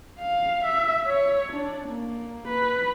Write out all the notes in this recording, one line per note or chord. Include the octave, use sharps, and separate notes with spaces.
F5
E5
C#5
D4
A#3
B4